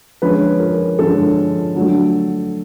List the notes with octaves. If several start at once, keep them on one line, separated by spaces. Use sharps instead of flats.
D3 F3 G#3 C#4 B4
A#4
D3 F3 G#3 C#4 A4
D3 F#3 A3